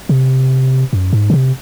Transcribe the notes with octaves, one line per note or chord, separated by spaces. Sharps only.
C3
F#2
G#2
C#3
C3